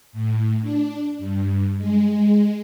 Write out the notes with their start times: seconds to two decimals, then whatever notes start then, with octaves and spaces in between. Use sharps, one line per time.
0.13 A2
0.61 D4
1.19 G2
1.77 G#3